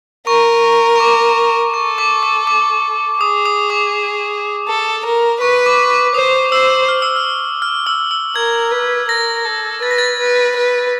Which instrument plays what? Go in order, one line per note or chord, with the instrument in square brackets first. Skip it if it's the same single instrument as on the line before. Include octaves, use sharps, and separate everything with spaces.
[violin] A#4 [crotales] C#6
[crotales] C#6
D6
[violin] A4 [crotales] C#6
[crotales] D6
D6
D6
[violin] G#4 [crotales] D#6
[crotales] D#6
D6
[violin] A4
A#4
[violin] B4 [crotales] C#6
[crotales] D6
D6
[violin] C5 [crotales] D#6
[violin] C5 [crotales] E6
[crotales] F6
E6
F6
F6
E6
E6
[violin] A#4 [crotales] G#6
[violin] B4
[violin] A#4 [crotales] A#6
[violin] A4
[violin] B4 [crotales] A6
[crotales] A#6
A6
[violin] B4
B4